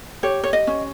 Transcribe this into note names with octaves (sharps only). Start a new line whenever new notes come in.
G4 C#5
C#5
D#5
C#4